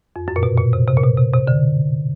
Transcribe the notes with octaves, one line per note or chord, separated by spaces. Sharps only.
F2
F#2
A#2
B2
A#2
C3
C3
A#2
B2
C3
C3
D3